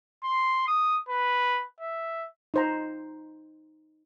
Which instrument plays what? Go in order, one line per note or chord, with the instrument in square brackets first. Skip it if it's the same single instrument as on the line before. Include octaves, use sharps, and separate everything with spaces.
[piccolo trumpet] C6
D#6
B4
E5
[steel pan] D#4 C5 A#5